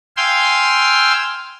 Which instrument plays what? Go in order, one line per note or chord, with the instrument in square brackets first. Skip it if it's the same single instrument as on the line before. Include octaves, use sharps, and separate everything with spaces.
[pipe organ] F5 G5 G#5 C6 E6